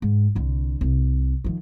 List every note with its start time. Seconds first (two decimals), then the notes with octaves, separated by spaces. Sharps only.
0.02 G#2
0.35 C2 D3
0.81 C2
1.44 D#3 F3